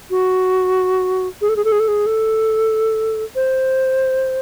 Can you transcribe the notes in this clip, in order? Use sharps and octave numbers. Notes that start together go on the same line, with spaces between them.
F#4
G#4
A4
G#4
A4
G#4
A4
G#4
A4
C5